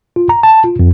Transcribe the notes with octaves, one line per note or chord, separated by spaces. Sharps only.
F4
A#5
A5
F4
F2